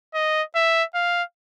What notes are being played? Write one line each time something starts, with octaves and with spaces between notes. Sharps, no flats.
D#5
E5
F5